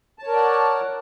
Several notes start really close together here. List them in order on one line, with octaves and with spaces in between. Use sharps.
A5 C#5 A#4 D5 F#5